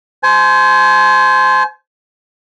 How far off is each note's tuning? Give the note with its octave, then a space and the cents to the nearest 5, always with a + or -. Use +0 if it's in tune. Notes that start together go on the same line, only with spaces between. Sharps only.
C5 -5 G#5 +35